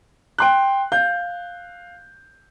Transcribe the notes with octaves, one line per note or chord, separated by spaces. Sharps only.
G5 C6 F#6
F5 G6